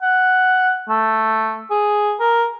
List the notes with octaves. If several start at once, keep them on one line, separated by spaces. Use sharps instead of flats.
F#5
A3
G#4
A#4